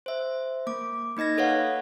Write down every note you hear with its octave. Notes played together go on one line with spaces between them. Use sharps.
C5 E5
A#3 D6
A#3 D#4 D#5 G#6 A#6
A4 B4 C#5 F5 F#5